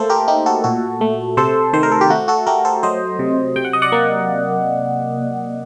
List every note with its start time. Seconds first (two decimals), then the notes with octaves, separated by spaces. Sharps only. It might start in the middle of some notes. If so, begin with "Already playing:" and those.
Already playing: A3 A#3 A4 C5
0.09 G4 A#4
0.28 A3 D#4 G4
0.46 F#4 A4
0.64 A#2 F#4 A4
1.01 A3
1.37 C3 A4 C5
1.73 D#3 C5
1.83 A#4
1.92 A4
2.01 G4
2.10 A3 F#4
2.28 F#4 A4
2.46 A3 G4 A#4
2.65 A4 C5
2.83 F#3 C5 D#5
3.19 C3
3.56 C3 G5
3.65 F#5
3.73 D#5
3.82 D5 F#5
3.92 A#3